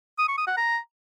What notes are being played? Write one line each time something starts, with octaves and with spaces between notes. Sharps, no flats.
D#6
C#6
D#6
F#5
A#5